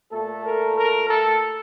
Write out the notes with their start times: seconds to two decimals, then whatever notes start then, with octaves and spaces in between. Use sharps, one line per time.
0.11 A#2 A3 A4
0.44 A#4
0.76 A#4
1.08 A4